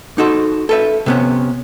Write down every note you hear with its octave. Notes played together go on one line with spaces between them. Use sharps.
D#4 F#4 A4 C5
A4 B4 E5
C3 B3 C#4